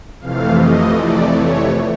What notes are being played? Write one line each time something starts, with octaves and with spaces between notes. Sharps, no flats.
F2 C3 E3 A3 F5
D#5
D5
C#5